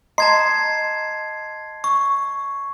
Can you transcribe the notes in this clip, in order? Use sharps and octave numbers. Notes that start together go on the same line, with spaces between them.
D#5 A5 A#5 C6 G#6 C7
C#6